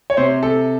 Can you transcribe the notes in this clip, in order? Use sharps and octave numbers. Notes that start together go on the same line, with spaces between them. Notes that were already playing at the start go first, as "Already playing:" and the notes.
C#5
C3 C5
C3 A4